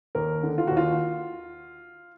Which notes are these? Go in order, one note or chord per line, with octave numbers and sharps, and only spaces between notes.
D#2 A#4
D3
F4
D#2 F#4
F4